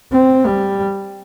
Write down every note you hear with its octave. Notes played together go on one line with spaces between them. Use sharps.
C4
G3